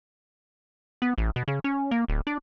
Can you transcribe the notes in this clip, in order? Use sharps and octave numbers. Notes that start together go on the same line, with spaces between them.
B3
A1
B2
C#3
C#4
A#3
D1
D4